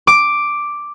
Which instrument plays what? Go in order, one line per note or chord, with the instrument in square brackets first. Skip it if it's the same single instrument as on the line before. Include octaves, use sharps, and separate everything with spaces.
[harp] D6